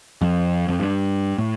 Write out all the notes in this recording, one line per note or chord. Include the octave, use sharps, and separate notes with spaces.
F2
F2
G2
A2